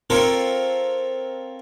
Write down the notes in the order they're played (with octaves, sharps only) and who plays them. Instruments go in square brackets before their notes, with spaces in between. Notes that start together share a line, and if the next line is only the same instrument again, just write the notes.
[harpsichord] C4 F4 A4 A#4 C#5